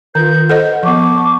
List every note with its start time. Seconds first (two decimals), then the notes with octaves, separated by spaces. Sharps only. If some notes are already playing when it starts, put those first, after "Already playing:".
0.15 D#3 F4 B4 G6
0.50 A4 C5 D#5 F#5
0.83 F3 B3 A5 C#6 D6